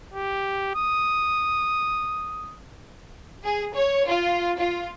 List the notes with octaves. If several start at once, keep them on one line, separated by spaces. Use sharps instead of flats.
G4
D#6
G#4
C#5
F4
F4